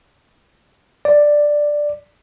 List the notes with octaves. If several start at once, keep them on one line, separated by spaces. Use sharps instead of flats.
D5